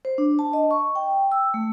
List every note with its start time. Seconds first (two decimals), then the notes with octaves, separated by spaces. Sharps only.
0.05 C5
0.18 D4
0.39 A5
0.53 D#5
0.71 C#6
0.96 G5
1.32 E6
1.54 A3